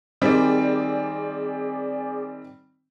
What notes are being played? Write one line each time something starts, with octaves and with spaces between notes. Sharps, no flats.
D#3 G3 C4 G#4 D5